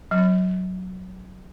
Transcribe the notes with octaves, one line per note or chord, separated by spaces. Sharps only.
F#3